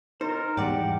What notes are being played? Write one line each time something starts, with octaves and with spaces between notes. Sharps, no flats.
D#4 A#4 C5
E2 G#2 G3 D5 F#5 G5